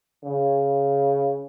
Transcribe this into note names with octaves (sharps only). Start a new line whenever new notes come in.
C#3